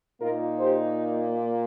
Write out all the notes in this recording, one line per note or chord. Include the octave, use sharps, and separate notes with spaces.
A#2 A#3 D#4 F4 A#4
G4 C5